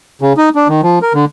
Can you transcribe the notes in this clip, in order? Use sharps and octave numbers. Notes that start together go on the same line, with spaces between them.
C#3
D#4
D4
D#3
F3
A#4
D3